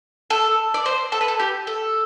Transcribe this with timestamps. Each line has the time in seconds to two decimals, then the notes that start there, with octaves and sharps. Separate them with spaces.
0.30 A4
0.74 D5
0.86 C5
1.12 A4
1.21 B4
1.28 A4
1.39 G4
1.67 A4